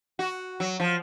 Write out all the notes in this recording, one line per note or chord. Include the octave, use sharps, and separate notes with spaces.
F#4
F#3
F3